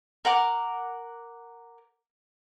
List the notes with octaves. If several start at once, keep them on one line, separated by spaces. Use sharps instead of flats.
A#4 F#5 D6